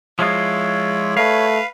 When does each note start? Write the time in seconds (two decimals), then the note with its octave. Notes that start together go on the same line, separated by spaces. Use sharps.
0.19 F3 G#3 E4 F4 C#5
1.17 A3 B4 F5